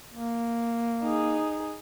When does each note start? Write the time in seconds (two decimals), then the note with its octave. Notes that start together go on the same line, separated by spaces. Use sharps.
0.13 A#3
1.03 D#4 G#4